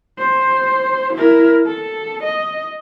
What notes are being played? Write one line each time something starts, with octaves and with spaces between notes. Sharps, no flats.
C5
E4 A#4
A4
D#5